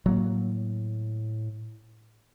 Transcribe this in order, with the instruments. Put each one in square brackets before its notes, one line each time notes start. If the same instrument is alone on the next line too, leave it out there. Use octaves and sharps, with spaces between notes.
[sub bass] A2 [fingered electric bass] F#3 A#3